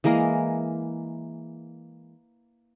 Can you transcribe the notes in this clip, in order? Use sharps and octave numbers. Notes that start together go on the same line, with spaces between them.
E3 G#3 A#3 A#4